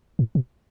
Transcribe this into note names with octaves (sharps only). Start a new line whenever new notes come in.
A2
B2